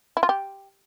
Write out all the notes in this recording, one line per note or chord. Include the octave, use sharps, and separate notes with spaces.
E4
F4
G4